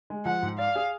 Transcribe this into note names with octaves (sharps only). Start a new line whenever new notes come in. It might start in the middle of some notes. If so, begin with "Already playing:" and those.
G#3
F3 F#5
G#2
D5 F5
G#4